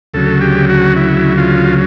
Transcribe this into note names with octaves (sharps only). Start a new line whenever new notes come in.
D2 C#3 F#3 A4
G4
F#4
E4
F4